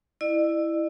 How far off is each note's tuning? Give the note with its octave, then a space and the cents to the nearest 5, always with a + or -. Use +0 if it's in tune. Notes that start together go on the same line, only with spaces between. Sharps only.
E4 +0 D5 +45